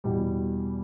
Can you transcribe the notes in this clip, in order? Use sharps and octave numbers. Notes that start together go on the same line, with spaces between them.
E2 B2 G3